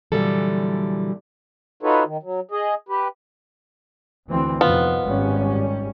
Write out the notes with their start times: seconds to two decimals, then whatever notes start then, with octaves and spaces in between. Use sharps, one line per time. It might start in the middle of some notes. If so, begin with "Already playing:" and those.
0.12 A#2 D3 E3 F#3 G3 A4
1.83 D#4 F4 F#4 A4 B4 C#5
2.05 D#3
2.23 F#3
2.51 G#4 D#5
2.89 G4 B4
4.28 D2 E3 C4
4.61 F2 C3 D#3 B3 F4
5.04 G#1 G3 C#4